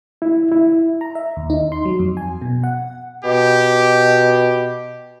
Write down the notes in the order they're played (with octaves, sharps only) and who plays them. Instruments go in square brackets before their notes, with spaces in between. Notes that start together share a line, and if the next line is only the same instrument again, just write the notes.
[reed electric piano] E4
E4
[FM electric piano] A#5
E5
D#2
D#4
C6
F#3
F2
G#5
B2
F#5
[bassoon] B2 [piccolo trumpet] G4